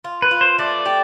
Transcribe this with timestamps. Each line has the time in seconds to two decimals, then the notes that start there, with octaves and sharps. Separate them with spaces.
0.04 F4
0.22 B4
0.31 F4
0.41 C5
0.58 A3 D5
0.86 G4